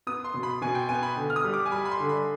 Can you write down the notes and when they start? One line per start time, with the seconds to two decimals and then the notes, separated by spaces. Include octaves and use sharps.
0.07 B3 D#6
0.24 C6
0.34 B2
0.43 B5
0.62 B2 G#5
0.75 G5
0.89 B3 G#5
1.03 B5
1.17 D3
1.30 F6
1.36 D#6
1.45 G3
1.54 D6
1.66 G#5
1.72 G3 B5
1.85 B5
1.91 C6
2.00 D3
2.09 B5